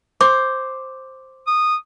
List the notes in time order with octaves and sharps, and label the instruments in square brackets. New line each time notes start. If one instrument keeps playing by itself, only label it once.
[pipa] C5 [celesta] D6
[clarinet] D#6